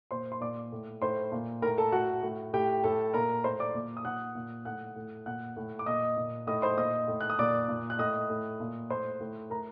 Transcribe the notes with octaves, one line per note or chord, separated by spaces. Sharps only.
A#2 C5 C6
C6
A#2 D5 D6
A2
A2 C5 C6
A#2
A2 A#4 A#5
A4 A5
A2 F#4 F#5
A2
A2 G4 G5
A2 A4 A5
A#2 A#4 A#5
A2 C5 C6
D5 D6
A#2
D#6
A#2 F#5 F#6
A#2
A2 F#5 F#6
A2
A#2 F#5 F#6
A2
D6
A#2 D#5 D#6
A#2
A2 D#5 D#6
C5 C6
A#2 D#5 D#6
A2
F#6
D#6
A#2 D5 D6
A#2
F#6
A2 D#5 D#6
A2
A#2
A2 C5 C6
A2
A2 A#4 A#5